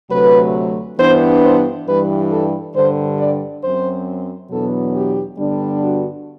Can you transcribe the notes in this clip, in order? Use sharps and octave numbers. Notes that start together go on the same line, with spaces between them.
D2 C3 F#3 A3 B4
G2 E3 B3 D4 C5
C5
G2 E3 G3 B4
A4
G2 D3 G3 C5
D5
F#2 F#3 C4 C5
E2 B2 F#3 B3 D4 A4
G4
G2 D3 G3 B3 D4
F#4